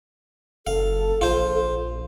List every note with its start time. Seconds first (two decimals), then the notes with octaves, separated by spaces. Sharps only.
0.67 F#1 A4 F5
1.21 A#1 F4 C5